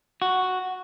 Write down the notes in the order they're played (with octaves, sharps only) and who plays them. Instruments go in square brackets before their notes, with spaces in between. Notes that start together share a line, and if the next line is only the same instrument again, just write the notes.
[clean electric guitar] F#4